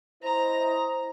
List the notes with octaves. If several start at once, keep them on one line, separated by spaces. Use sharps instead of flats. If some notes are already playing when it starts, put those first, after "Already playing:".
E4 C5 D#5 A#5